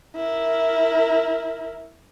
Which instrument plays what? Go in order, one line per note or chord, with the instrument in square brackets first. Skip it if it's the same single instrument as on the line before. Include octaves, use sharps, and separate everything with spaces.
[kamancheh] E4 A#4